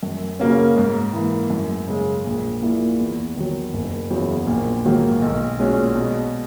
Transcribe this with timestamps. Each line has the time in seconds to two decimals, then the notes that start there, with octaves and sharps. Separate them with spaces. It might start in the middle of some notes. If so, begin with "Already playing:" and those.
0.03 F#2
0.39 C#3 F#3 A#3 C#4
0.77 G#2
1.13 E3 A#3
1.50 F#2
1.88 C#3 G#3
2.25 A#1
2.62 A#2 A#3 E4 G#4
2.99 E2
3.37 D#3 F#3
3.74 F#1
4.10 E2 C#3 F#3
4.47 A#1
4.85 G#2 D#3 F#3 A#3
5.22 B1
5.59 A#2 G#3 C#4 F#4
5.96 B2